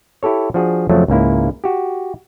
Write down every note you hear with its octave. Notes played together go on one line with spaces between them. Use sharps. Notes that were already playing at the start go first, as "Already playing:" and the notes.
E4 G4 A4 C#5
F3 D4 F#4 G#4
F2 C#3 F3 F#3 A3
C#2 G#2 A#3 E4
F#4 G4